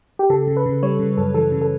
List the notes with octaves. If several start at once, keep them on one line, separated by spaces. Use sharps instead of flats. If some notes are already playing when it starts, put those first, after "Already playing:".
G4
C#3 A4
C#3
B4
C#3
G3 C#5
C#3
F#2 A4
E3 A4
C#3
A4